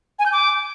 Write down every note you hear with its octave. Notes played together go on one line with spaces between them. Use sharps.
G#5
G6
D6